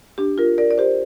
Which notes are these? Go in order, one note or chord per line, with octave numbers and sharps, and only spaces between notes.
D4 G4
F4 A#4
A#4 D5
D5
G4 C5